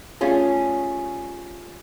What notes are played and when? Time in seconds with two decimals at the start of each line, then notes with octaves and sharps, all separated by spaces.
0.21 G3 A3 C#4 F4 G#4